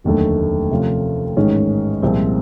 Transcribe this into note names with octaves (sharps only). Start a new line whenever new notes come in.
F1 D#2 D3 F#3 A3
C3 F3 A3 C#4 F4
A1 G#2 D#3 G#3 C#4
C2 A#2 F3 G#3 C4